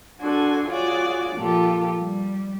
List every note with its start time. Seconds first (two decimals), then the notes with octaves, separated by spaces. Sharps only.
0.20 D4 F#4 A4 G#5 C6
0.68 F4 F#4 G#4 C#5 D5
1.37 A#2 F3 F4 G4 A4
2.01 G3